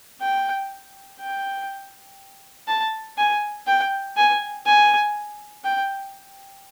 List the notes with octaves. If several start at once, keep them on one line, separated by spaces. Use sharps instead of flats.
G5
G5
A5
G#5
G5
G#5
G#5
G5